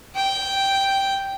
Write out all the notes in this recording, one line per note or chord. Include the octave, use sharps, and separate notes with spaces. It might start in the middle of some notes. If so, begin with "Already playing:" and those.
G5